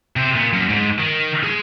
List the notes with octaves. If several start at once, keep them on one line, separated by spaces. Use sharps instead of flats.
C3 C5
A#2
F#2
G#2
D#3
G#4 C6